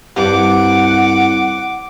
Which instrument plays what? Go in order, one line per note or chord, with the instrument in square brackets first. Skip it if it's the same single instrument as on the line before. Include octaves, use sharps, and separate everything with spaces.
[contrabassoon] C2 [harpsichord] G2 [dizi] F#5 [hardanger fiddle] D6